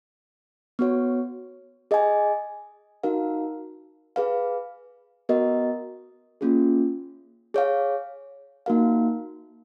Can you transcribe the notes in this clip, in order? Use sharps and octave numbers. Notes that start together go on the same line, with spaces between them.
B3 F#4 C#5
G#4 D#5 G#5
D#4 F#4 A#4 F5
G#4 B4 F5
B3 F#4 A#4 D#5
A#3 C#4 F4 G#4
G#4 C#5 F5
A#3 D#4 F#4 A#4 F5